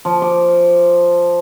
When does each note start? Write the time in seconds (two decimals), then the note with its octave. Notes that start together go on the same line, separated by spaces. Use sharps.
0.05 F3
0.22 D6